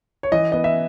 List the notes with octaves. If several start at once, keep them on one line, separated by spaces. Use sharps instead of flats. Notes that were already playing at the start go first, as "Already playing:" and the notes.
C#5
E3 D#5
B3 D#5
E5